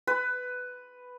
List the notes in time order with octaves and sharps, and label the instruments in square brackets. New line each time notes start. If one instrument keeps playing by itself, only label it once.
[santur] B4